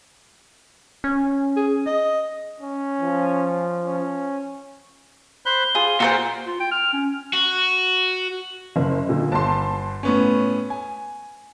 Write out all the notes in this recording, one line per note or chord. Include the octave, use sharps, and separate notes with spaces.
C#4
G#4
D#5
C#4
F3
C#4
C5 B5 F#6 G7
F4 G#4
A#2 F#4 A4 C5
F4
G5
F6
C#4
F#4
F#1
A#2 D3
G1 A5 C6
A2 B3 C#4
G#5